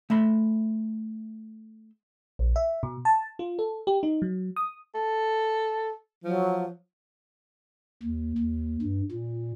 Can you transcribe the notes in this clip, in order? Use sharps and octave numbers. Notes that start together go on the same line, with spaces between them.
A3 E5 B5 C6
A#1
E5
B2
A5
F4
A4
G4
D#4
F#3
D#6
A4
F3 F#3
D#2
D#2
G2
A#2